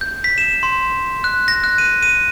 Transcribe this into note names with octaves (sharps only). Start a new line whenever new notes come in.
G6
B6
E7
C6
F#6
A#6
F#6
D#7
D#7